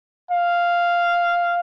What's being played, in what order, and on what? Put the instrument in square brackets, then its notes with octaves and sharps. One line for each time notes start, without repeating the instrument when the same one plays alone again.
[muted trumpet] F5